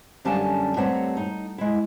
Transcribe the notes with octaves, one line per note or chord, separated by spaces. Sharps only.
F#2 D3 G3 C#4 F5 A5
G2 A3 C4 C#5 F#5 A#5
D#4
G#3 E4